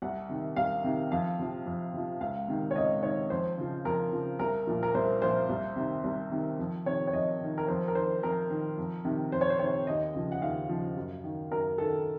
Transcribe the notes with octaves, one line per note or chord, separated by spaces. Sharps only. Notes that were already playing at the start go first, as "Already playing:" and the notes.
C2 F#5
C3 D#3
C2 F5
C3 D#3
F2 F5
C3 F3
F2
C3 F3
C#2 F5
C3 D#3
C#5
C#2 D#5
C3 D#3 C#5
F2 C5
C#3 F3
F2 A#4
C#3 F3
C2 A#4
A#2 F3
A#4
C2 C5
A#2 F3 C5
C2
C3 D#3
C2
C3 D#3
F2
C3 D#3 C#5
C#5
F2 D#5
C3 D#3
A#4
F2 C5
A#4
D#3 C5
F2 A#4
D#3
F2
C3 D#3
F2 C5
C#5
C5
C3 D#3 C#5
D#2 D#5
C#3 F3
F#5
D#2 F5
C#3 F3
F#2
D#3
F#2 A#4
D#3 A4